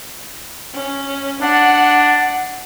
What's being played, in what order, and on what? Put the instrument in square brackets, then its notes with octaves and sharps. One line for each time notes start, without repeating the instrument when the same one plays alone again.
[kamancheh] C#4
[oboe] D4 [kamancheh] F#5